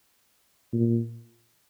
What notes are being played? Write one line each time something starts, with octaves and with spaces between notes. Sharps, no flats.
A#2